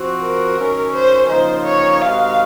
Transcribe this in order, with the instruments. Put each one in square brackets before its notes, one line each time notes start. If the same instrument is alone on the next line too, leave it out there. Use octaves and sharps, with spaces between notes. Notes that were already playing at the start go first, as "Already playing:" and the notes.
Already playing: [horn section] F3 C4 F#4
[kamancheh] A#4
[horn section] D#3 F#3 C#4
[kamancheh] C5
[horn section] C#3 F3 A#3 D#4 [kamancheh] C5
[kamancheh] C#5
[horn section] C3 D#3 G#3 D#4 F#4 [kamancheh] F5